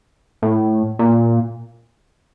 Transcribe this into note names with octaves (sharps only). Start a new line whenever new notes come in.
A2
A#2